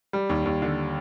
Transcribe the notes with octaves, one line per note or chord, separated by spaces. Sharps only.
G3
D#2
D#2
D3